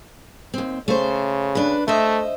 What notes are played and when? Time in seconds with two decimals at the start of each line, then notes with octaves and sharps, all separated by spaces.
0.54 D#2 C4
0.88 C#3 A3 C5
1.55 D4 B4
1.88 A3 C5 D#5 E5